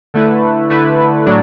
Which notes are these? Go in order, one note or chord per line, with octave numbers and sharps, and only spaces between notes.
D3 A3 E4 B4
D3 A3 E4 B4
A2 F#3 D4